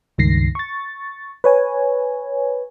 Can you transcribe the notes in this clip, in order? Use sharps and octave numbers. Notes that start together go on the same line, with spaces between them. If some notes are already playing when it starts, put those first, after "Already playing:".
C#2 G2 D#3 A#6 C7
C#6 A6
B4 C#5 G#5